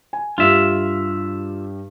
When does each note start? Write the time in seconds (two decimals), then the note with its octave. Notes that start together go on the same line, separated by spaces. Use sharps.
0.13 G#5
0.38 G2 F4 G4 E5